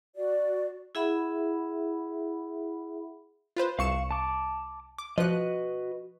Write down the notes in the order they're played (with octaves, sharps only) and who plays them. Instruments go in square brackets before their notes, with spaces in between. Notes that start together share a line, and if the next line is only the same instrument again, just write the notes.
[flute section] F#4 D5
[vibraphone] E4 G#4 E5 F#5 B5
[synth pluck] F4 B4 C5
[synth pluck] C2 C#7 E7 [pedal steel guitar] F5 C#6
[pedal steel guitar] A5 D6
[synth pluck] D6
[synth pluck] F3 F#6 [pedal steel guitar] F#4 B4 D#5